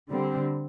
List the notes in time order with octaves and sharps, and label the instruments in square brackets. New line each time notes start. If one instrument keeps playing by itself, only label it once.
[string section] D3 G3 C4